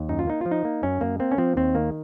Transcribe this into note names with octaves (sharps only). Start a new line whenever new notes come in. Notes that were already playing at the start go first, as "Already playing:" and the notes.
Already playing: D#2
F#2 D#4
F4
A#3 D#4
F3 F4
D#4
A#3
F#2 C#4
F#2 A#3
A#3 C4
C#4
F3 C4
D#2 C4
D#3 A#3